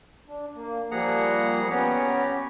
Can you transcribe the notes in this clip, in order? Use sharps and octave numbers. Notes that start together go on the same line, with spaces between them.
D4
A#3
F3 G3 A#3 G#4 F#5 A#5
B3 C#4 G4 C#5 A#5